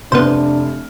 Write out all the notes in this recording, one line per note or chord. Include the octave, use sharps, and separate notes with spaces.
F1 B3 D4 C5 F6